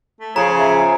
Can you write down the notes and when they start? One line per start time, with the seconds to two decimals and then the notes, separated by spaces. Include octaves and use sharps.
0.20 A3
0.36 C#3 F3 G#4 C#5 A#5
0.58 E5
0.77 G#5